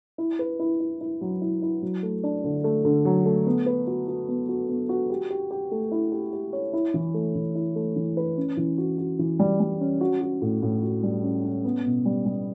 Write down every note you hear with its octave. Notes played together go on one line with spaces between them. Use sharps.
E4
B4
E4
E4
E4
F#3
E4
E4
F#3
A3
D4
D3
A3
D3
F#3
A3
B3
B4
F#4
F#4
B3
F#4
B3
F#4
G4
G4
G4
A3
E4
G4
G4
C#5
E4
E3
A3
E3
E4
A3
E3
B4
C#4
E3
F#4
F#4
E3
G3
G3
C#4
F#4
F#4
A2
A2
F#4
G3
C#4
C#4
B3
B2
G3
G3